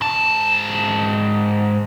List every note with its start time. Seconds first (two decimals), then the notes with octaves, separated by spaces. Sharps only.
0.01 G#2 A5